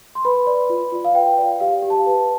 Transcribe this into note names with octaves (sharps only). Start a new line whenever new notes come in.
C6
B4 B5
D5
F4
F4
F5
B4 G5
D5
G4 F5
G4
A5
B4